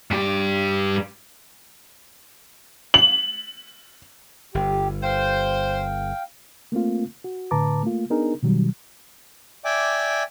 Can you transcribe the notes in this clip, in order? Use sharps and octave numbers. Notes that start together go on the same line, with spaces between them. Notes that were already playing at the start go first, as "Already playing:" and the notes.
G2 G4
F#7
G1 G4
C5 F5 G5
A3 A#3 C4 F4
F#4
A2 D3 B4 A5 A#5 D6
A3 A#3 F4
B3 D4 D#4 G#4 A#4
B2 D#3 F#3 G3
D5 E5 G5 G#5 D6